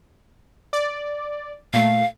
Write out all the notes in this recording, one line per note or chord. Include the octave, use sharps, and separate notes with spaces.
D5
A#2 A3 F5